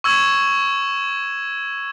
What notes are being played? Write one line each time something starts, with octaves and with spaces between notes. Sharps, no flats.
C#6 E6 G#6 E7 F#7